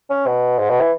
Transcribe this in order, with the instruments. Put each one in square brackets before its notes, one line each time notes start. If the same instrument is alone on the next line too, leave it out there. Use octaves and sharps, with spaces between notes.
[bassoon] C#4
B2
G#2
B2
E3